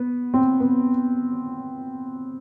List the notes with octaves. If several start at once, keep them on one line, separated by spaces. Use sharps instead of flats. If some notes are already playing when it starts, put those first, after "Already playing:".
Already playing: B3
C4
B3